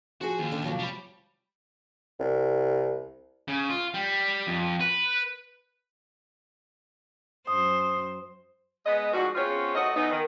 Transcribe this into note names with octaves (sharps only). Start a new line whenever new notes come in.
F3 F#4 G#4
D#2
D3
C3 F3 F#3
G3 B5
C2
C#3
F4
G3
F2
B4
F#2 C5 D#6
G#3 B3 B4 D#5
G#2 F3 G3 F#4
C#3 B3 C4 F4 G#4 C#5
A3 E4 F#4 D#5
E3 B3 D#4
D#3